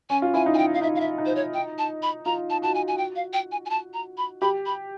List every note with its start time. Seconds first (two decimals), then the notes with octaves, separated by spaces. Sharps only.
0.10 C#4 G#5
0.22 F4
0.34 E4 G#5
0.46 D#4
0.54 G#5
0.58 G5
0.74 F5
0.82 D#4 E5
0.96 F5
1.00 E5
1.18 D#4
1.26 C5
1.35 C#5
1.54 G5
1.78 A5
2.03 B5
2.25 F4 A#5
2.50 A5
2.62 F#4 A5
2.75 G#5
2.88 G#5
2.98 G5
3.16 F5
3.33 G5
3.52 G#5
3.66 G#5
3.70 A5
3.94 A#5
4.18 B5
4.42 G4 B5
4.66 B5